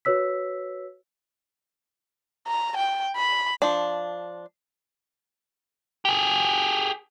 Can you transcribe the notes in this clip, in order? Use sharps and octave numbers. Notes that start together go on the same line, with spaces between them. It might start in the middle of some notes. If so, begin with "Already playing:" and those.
F#4 B4 C#5 E6 B6
A#5
G5
B5
F3 D4
G4 G#4